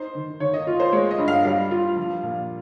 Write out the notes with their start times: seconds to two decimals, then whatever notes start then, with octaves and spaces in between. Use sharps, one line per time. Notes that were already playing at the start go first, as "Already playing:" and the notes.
Already playing: D#4 C5
0.15 D#3
0.40 D#3 C#5
0.54 D#5
0.67 F4
0.80 C5
0.92 G#3 C#5
1.11 D#5
1.18 G2
1.28 F5
1.45 G3 F5
1.71 F4
1.97 F3
2.23 A#2